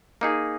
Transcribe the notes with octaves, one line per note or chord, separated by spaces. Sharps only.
A#3 D#4 G#4